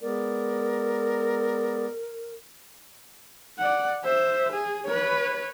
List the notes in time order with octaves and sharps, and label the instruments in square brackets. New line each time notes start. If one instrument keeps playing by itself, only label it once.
[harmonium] G#3 B3 D5 [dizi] A#4
[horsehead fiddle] D5 F#5
C5 E5
G#4
B4 C#5